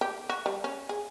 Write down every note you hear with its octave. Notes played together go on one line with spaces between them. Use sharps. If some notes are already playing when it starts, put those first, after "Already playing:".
G4
F#4
G3
C#4
G#4